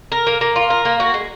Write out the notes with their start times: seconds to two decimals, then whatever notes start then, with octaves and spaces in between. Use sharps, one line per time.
0.12 A#4
0.27 A#3
0.41 A#3
0.56 F4
0.70 A#4
0.85 A#3
1.00 F#4
1.14 G#3